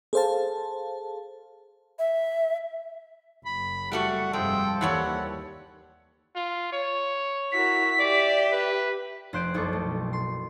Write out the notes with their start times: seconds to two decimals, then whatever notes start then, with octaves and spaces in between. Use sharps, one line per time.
0.13 G#4 A4 C5 F5 A5
1.99 E5
3.46 F#1 B5
3.92 G3 A3 F#4 F#5
4.33 F1 G2 F3 G#3 A4 G5
4.81 D#2 E3 G3 C#5 F#5
6.36 F4
6.73 C#5
7.52 E4 F#4 A#4 B6
8.00 G4 D5 E5
8.52 B4
9.33 F1 C5 F#6 G6 D7
9.54 F#1 B1 B2 A4 C#6 D6
9.73 A3
10.13 C6